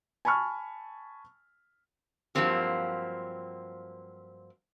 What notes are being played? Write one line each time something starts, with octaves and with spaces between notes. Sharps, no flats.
G#5 A5 B5 C#6 F6
G2 F3 F#3 A#3 C4 G4